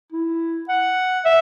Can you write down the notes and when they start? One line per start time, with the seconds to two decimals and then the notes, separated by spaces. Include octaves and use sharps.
0.12 E4
0.68 F#5
1.25 E5